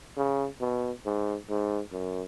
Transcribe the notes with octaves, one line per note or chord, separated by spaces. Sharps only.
C#3
B2
G#2
G#2
F#2